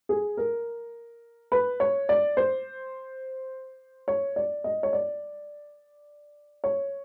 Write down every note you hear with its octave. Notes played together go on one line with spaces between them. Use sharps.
G#4
A#4
B4
C#5
D5
C5
C#5
D5
D#5
C#5
D5
C#5